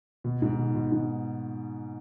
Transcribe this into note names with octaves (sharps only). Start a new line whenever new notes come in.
B2
G#2
B2
B2
G#2